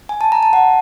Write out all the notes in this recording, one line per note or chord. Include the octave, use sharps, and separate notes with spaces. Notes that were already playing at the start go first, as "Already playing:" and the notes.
G#5
A5
A#5
A5
F#5